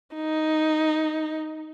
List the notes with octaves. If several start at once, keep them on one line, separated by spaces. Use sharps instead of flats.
D#4